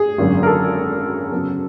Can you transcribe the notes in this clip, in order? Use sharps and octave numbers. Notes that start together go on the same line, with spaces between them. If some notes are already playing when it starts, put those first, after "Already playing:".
Already playing: G#4
G#1 F#2 D3 F#3 A#3
A#4
A4
F#2 C#3 F#3 B3